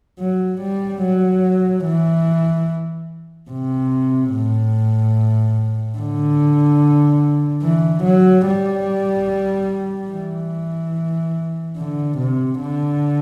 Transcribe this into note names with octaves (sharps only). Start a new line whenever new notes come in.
F#3
G3
F#3
E3
C3
A2
D3
E3
F#3
G3
E3
D3
C3
D3